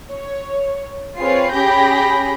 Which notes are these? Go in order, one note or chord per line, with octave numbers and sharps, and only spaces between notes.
C#5
C4 F4 G#4 B4 C#5 C7
C#4 G4 G#4 B5 G6 A#6